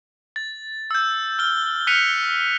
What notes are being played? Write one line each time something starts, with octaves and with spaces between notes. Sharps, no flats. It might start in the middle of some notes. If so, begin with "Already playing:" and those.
A6
E6 G6
F6 G7
F6 F#6 B6 C#7 D#7 F7